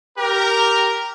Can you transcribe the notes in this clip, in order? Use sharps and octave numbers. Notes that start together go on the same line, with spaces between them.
G4 A#4